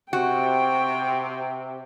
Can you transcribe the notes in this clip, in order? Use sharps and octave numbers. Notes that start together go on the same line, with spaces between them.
C3 F#4 G5